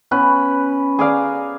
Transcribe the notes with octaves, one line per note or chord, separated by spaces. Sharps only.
B3 C#4 B4
G#4 D5 F5 A#5